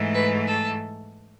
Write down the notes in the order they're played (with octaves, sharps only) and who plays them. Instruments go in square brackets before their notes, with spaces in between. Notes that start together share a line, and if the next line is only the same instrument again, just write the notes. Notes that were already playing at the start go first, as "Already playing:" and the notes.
Already playing: [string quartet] G#2 E3 A3
B4
A4